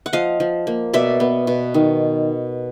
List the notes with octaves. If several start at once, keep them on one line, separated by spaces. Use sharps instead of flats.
F#5
F3 D#5 F5
F3
A#3
B2 D5 E5
B3
B2
D#3